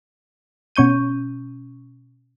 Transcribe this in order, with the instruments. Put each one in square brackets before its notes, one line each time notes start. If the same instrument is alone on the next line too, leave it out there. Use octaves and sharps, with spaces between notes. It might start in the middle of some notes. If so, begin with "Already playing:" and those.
[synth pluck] B2 C#4 C#6 G6 D#7